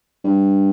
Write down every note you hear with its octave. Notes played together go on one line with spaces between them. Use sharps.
G2